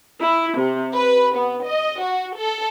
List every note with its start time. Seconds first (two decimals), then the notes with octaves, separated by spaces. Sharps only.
0.20 E4
0.58 C3
0.93 B4
1.36 B3
1.64 D#5
2.02 F#4
2.37 A4